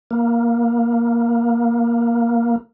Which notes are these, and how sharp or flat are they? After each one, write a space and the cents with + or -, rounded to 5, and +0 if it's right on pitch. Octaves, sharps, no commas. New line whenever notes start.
A#3 +10